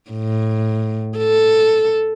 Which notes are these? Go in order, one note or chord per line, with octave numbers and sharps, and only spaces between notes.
A2
A4